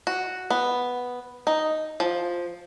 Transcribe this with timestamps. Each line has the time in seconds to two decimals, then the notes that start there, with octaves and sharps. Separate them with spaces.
0.07 F#4
0.50 B3
1.47 D#4
2.00 F3